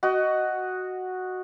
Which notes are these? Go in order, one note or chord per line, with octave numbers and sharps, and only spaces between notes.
F#4 D#5